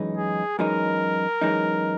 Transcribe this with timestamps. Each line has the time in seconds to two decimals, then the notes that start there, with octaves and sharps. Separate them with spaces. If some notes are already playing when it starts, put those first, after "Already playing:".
Already playing: F#2 E3 G#3 D#4
0.17 G#4
0.59 F#2 E3 G#3 D#4 A#4
1.41 F#2 E3 G#3 D#4